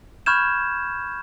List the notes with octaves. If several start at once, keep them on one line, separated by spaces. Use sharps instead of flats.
B5 C#6 F6 G6 G#6 E7